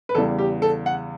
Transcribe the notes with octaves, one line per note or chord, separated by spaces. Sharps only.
B4
E2 C#3 E3 G3 A4
G4
A4
F#5